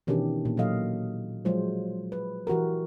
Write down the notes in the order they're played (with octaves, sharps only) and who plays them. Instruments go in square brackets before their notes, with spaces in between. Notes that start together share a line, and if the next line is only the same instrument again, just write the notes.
[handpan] B2 D#3 E3 C#4 D4 G4
A#2
A#2 F#3 A4 D#5 F5
F3 F#3 G#3 F4 C5
B4
E3 F#4 G4 A#4